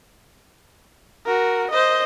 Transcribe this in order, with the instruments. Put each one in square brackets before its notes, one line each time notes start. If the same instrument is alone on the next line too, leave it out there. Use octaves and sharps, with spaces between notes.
[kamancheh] F#4 A#4
C5 D#5